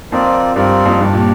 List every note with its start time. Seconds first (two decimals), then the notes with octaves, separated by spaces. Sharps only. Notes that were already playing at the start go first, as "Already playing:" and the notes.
0.12 F2 C4 F4 A#4 D5
0.55 G2 C4 F4 A#4 D5
0.85 F2
0.99 G2 D4 G4 D5
1.13 A#2